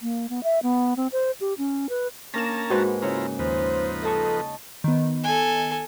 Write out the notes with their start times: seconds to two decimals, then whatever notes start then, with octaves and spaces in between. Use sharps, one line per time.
0.02 A#3
0.29 B3
0.44 E5
0.63 B3
0.97 C4
1.12 C5
1.41 G4
1.58 C#4
1.89 B4
2.34 A#3 C#4 D4 A#4 A5 A#5 A#6 E7
2.70 G#2 F#4 B4 C5
3.02 C#3 C#4 E4 F4 A#5
3.39 D#2 F3 D#4 B4 C5
4.03 A4 D#5 A5 C#6
4.84 D#3 B3
5.24 A4 G#5